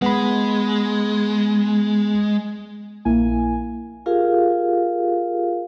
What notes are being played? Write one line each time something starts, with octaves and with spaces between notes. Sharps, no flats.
G#3 B3 B5
A#1 A#3 E4 G#5
F4 G4 G#4 A#4 F5